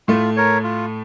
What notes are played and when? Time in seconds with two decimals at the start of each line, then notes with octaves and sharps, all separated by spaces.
0.08 A2 A3 F4
0.37 A#4 C#5
0.64 F4